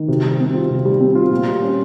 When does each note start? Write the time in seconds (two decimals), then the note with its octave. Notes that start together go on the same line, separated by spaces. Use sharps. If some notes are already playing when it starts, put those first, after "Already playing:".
Already playing: D#3
0.08 C3
0.24 G3
0.40 C4
0.54 F4
0.70 C3
0.85 G3
1.01 C4
1.15 F4
1.31 A#2
1.46 G3
1.62 C#4